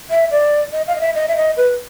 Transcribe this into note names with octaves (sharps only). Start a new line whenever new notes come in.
E5
D5
D#5
F5
D#5
E5
D#5
E5
D#5
B4